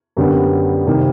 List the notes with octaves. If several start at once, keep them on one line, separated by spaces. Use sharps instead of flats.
F#2 D3 G3 B3 D4
C3 D#3 G3 A#3